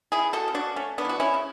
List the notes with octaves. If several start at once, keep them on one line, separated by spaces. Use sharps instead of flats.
E4 G#4
C#3
F#4 A4
C#3
D4 F#4
A3 C#4
B3 D4
E3 F#4
C#4 E4
C#3